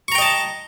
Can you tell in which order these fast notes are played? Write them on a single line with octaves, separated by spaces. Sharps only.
C#6 A#5 G5 D#5 A5